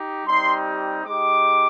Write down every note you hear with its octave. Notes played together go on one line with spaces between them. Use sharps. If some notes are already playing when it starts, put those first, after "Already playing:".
Already playing: D#4 G4
G3 C4 D#4 G4 C6
G#3 D#4 G4 D6